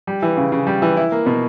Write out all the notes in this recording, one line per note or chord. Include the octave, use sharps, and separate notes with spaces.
G3
E3
C#3
C#3
G3
E3
E4
A#3
B2